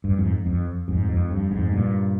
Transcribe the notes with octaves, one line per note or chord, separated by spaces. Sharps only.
G2
F2 G#2
F2
F2 G#2
F2
G2
F2 G#2
G2 A#2